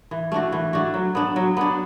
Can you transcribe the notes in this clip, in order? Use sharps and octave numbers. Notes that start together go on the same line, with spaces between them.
E3
A3 D4 F#4
E3
A3 D4 F#4
F#3
B3 D4
F#3
B3 D4